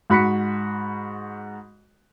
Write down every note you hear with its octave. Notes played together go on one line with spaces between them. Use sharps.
G#2 F#4 B5 F#6 B6 C#7